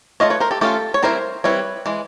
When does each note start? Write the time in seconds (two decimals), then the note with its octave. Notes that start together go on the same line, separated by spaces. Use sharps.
0.20 A3 C#4 F4 C#5 D#5
0.30 B4 C#5
0.40 A#4 C5
0.51 G4 A4
0.61 A3 C#4 F4 G4 A4
0.94 C#5
1.02 G3 C4 E4 A#4 C5
1.44 G3 C4 E4 B4 C#5
1.86 E3 G#3